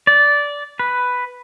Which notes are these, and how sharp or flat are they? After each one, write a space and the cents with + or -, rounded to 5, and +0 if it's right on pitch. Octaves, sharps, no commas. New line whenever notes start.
D5 -15
B4 +5